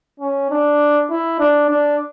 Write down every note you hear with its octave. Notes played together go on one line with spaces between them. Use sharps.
C#4
D4
E4
D4
D4